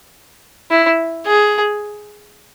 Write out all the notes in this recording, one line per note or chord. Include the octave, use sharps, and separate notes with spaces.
E4
G#4